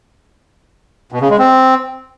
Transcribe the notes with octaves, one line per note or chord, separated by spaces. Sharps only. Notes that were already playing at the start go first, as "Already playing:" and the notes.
B2
C#3
G#3
C4